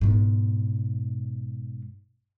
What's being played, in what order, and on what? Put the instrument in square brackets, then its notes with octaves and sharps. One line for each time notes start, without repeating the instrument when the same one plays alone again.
[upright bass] G#2 B2